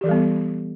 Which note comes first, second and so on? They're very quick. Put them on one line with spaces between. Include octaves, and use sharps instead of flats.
G4 E3 A4 G3 B3